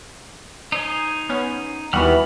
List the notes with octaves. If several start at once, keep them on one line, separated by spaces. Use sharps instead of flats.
D#4 C5 G#5
B3 C#4
D#2 E3 G3 B3 F#4 B5 F6